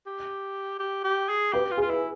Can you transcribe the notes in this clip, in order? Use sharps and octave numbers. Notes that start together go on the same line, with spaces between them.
G4
G4
G4
G#4
G4 B4
F4
G#4
F4
E4